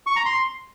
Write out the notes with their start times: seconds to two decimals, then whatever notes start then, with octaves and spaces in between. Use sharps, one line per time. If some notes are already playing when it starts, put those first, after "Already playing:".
0.07 C#6
0.16 A#5
0.26 C6